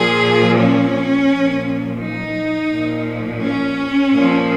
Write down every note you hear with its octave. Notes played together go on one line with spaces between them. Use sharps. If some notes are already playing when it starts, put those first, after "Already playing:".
Already playing: A#2 F3 G#4
C#4
A#2 F3
D#4
A#2 F3
C#4
A#2 F3